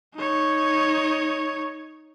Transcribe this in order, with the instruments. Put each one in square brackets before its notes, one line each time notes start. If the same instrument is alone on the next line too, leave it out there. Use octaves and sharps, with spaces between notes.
[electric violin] D#4 C#5